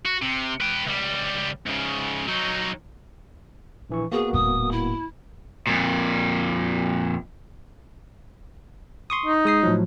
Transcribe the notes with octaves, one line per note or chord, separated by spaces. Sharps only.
F#4
C3
B4 G5
C#2 G3
G#2 C#3
F#3 D#4
A#1 E3 C#6
A#3 B3 F#4 G#4
D#1 A2 D#6
E4
F2 A#2
C6 C#6 D#6
D#4
G#3 D#6 C7
A2 F3 F#3